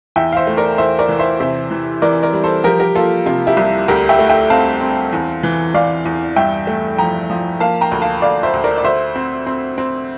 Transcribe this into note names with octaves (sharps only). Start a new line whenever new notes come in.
E2 E5 G5
F5
C5 E5
A3
A#4 D5
E2 C5 E5
A#4 D5
E3
C5 E5
C3 C5 E5
E3
E3 A#4 D5
A#4 D5
G3
A4 C5
F3 G4 A#4
G4 A#4
A#3 F4 A4
C3 F4
E4 G4
C2
D2 G4 A#4
E5 G5
A3
E5 G5
C4 F5 A5
C4
E2
E3
E3 D5 F5
E2
G2 E5 G5
A3
F3 G5 A#5
F3
A#3 F5 A5
G5 A#5
D2
F5 A5
D2 D5 F5
C5 E5
D2
A#4 D5
D5
D2 C5 E5
C4
C4
C4